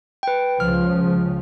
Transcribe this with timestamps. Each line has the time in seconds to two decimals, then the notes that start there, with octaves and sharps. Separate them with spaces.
0.23 B4 G5
0.60 C#2 C#3 F3 F6